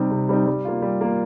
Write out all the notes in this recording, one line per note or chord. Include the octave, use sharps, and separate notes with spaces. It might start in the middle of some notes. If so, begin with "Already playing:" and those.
Already playing: C3 G3 C4 D#4
C3
G3 C4 D#4
G3
A#3 F4
G3
A#3 F4